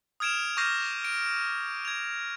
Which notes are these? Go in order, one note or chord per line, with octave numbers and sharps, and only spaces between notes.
D#6 F6 G#6 D7 E7 F7
C#6 D6 F6 G6 A#6 C7
D7
G#6 F7